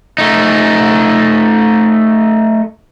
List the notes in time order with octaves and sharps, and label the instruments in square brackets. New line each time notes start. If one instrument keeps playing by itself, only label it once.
[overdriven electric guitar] A3 D#4